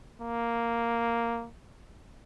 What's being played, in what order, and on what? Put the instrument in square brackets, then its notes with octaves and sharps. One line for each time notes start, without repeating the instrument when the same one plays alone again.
[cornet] A#3